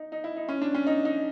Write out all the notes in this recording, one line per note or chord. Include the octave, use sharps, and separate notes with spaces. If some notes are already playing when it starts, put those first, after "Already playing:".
Already playing: D#4
D#4
E4
D#4
C#4
D4
C#4
D#4
D#4